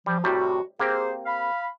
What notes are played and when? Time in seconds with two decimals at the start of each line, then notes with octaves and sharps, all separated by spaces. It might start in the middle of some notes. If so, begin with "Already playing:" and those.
0.06 F3 G3
0.24 A2 C3 G3 F#4
0.80 A#3 C4 G4 G#4 C5
1.25 F5 B5